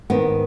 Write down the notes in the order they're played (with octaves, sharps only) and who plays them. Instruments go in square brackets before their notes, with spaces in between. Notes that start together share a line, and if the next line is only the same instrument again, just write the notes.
[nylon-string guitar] G#2 D#3 B3